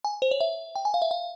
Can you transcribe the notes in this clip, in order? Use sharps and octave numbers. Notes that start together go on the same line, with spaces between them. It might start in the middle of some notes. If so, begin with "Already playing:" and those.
G#5
C5
C#5
E5
G5
G#5
F5
E5
F5